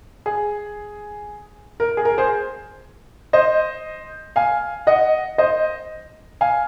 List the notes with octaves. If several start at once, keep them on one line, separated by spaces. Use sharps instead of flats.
G#4
A#4
G#4
A#4
G#4 C5
C5 D#5
F5 G#5
D#5 F#5
C5 D#5
F5 G#5